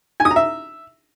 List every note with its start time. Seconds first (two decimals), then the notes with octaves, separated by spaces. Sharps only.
0.20 G#5
0.25 D#6
0.31 A#5
0.36 E5